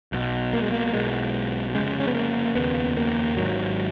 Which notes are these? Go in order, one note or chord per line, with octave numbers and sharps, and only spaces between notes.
B1 B2
A#3
G#3
A#3
B1 B2 G#3
F1 D#2 C#3 G#3
C#4
B3
A#3
F1 D#2 C#3 B3
A#3
G#1 G#2 F#3